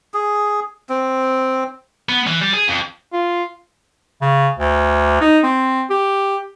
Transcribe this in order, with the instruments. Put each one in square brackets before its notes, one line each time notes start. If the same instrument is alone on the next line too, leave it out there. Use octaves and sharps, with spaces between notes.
[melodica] G#4
C4
[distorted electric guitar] B3
E3
G3
G#4
F2
[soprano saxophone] F4
[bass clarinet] C#3
D2
D#4
C4
G4